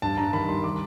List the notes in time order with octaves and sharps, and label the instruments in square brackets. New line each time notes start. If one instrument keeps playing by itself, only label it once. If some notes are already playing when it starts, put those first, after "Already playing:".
[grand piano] G2 A5
G2 A#5
D#3 B5
G3 C6
D6